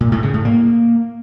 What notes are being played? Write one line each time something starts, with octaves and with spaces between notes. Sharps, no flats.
A#2
A2
C#3
A2
A#3